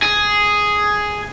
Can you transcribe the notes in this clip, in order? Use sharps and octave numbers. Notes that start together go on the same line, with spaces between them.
G#4